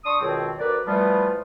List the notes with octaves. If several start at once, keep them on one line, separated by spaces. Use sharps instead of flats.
D4 C6 C#6 D#6
C#2 B2 D#3 F#3 C4
D2 A#4 B4 D5
E3 F3 G3 A3 B3 F4